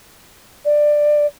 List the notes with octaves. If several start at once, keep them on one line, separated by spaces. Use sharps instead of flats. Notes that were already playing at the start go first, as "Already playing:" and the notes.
D5